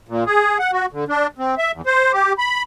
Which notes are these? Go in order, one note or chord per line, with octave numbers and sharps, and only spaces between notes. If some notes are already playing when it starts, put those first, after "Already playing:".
A#2
G#4
F#5
F#4
D3
D4
C4
E5
E2
C5
G4
B5